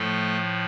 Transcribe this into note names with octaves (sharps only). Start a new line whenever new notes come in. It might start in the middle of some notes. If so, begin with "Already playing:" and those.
Already playing: A2 F3 A3 A4